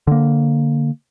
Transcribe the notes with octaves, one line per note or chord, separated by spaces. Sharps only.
D3 A#3